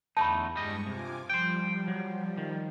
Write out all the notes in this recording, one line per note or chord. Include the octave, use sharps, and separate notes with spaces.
E2 D3 A3 D#4 A5 B5
G2 G3 G#3 D#5 C#6
C3 F4 G#5 D6
F3 G3 C5 G5
F#3
D#3